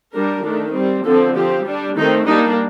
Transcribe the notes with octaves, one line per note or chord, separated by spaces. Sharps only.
G3 D4 A#4
D#3 A3 D4
G3 C4
D3 F3 C4 A4
F3 C4 G4
G3 D4
D#3 A3 C4 D#4
G3 A#3 D4 D#4